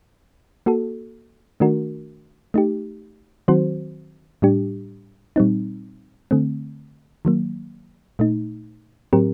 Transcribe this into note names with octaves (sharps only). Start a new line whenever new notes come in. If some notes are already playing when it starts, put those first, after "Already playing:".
A#3 F#4 A4
D#3 A3 D4 F#4 A#4
A3 D#4 G4
D#3 F#3 C4 F#4 C5
A2 G3 D4 G4
A#2 G3 C4 D#4
D3 A3 C4
D#3 F#3 A#3
A#2 A3 D#4
A2 F#3 C4 G4 A#4